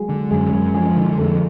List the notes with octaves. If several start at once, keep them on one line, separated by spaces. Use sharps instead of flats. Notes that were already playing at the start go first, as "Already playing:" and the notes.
Already playing: F#3 G#3 F#4 G#4
D3
F#2 G#3 G#4
F#2
F3 G#3 G#4
D3
F2 A3 A4